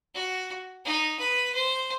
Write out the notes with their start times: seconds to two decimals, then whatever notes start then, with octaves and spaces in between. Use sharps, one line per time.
0.15 F#4
0.85 D#4
1.19 B4
1.54 C5